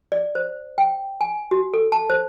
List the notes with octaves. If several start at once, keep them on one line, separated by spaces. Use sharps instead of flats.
D5
C5
G5
G#5
F#4
A4
A5
C5